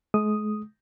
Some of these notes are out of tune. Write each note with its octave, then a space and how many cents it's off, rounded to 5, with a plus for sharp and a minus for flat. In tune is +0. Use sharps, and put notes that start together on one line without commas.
G#3 +40 D#6 +0